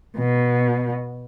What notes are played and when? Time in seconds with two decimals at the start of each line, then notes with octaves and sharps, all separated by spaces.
0.17 B2